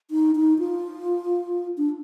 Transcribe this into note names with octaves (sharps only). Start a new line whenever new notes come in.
D#4
D#4
F4
D4